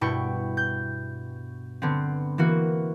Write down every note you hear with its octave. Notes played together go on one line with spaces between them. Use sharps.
G2 B2 E4 G5 C#6
G6
D3 B3 C4
E3 A#3 F#4